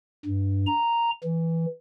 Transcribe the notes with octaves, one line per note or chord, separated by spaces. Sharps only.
G2
A#5
E3